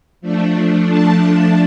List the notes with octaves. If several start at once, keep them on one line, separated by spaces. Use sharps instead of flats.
F3 A3 D4
A5